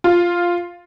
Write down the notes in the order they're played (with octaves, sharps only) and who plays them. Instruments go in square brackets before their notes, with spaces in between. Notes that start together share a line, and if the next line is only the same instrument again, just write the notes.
[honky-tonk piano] F4